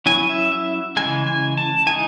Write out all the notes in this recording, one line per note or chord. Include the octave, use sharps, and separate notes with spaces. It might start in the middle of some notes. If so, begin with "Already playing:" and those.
F#3 C#4 E4 G#5
E5
E5
C#3 E3 G#3 G#5
G#5
A5
E3 G#3 D#4 G#5